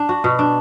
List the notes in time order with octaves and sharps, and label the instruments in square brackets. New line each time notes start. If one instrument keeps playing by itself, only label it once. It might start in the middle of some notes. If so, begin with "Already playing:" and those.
Already playing: [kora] D4
F#4
B2
D4